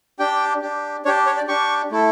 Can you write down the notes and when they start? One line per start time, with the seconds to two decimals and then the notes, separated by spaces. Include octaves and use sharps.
0.19 D4 G4 G5
0.62 D4 G4
1.05 D4 G4 C#5
1.26 C#5
1.37 D5
1.47 D4 G4 C#6
1.91 A3 E4 A4